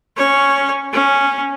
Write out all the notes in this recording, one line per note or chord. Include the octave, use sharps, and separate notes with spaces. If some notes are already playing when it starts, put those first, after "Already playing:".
C#4 C#5
C#4